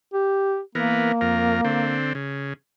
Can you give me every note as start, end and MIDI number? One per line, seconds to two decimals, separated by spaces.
0.13 0.60 67
0.75 1.12 52
0.75 1.98 58
0.75 1.12 59
0.75 1.12 70
1.21 1.61 41
1.21 1.61 70
1.65 2.13 50
1.65 2.13 60
2.15 2.53 49